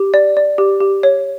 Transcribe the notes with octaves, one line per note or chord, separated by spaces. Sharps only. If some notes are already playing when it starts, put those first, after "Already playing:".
Already playing: G4
D5
D5
G4
G4
C#5